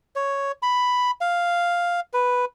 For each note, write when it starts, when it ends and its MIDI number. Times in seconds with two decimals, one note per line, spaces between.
0.16 0.52 73
0.62 1.11 83
1.21 2.00 77
2.13 2.45 71